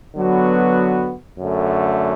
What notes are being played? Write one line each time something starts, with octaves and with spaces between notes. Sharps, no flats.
D3 F#3 B3 F#4
F#2 D3 A3